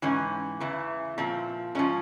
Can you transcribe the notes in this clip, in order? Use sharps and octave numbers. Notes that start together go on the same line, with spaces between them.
G#2 E3 C#4
E2 C#3 E3
A#2 F3 C4
G#2 F3 C#4